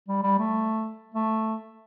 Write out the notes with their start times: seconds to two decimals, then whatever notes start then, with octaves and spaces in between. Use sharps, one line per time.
0.08 G3
0.23 G3
0.39 A3
1.15 A3